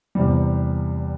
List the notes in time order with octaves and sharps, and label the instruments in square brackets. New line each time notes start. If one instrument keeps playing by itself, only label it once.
[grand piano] E2 C3 G3